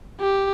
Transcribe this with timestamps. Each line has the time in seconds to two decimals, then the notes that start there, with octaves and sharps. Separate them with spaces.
0.20 G4